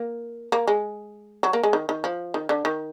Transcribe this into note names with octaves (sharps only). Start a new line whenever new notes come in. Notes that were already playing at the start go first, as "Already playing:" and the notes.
Already playing: A#3
A#3
G#3
F#3
A#3
G#3
D#3
D#3
F3
D#3
D3
D#3